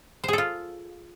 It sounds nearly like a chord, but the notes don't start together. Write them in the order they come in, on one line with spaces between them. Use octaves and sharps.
C5 G#4 A4 F4